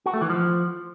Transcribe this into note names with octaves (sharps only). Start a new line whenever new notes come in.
F#4
A3
E3
F3